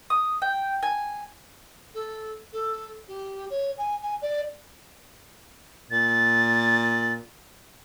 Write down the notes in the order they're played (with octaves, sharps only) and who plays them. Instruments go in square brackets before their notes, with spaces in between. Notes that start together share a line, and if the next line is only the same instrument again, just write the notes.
[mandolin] D#6
G5
G#5
[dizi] A4
A4
G4
C#5
G#5
G#5
D5
[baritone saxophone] A#2 [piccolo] A6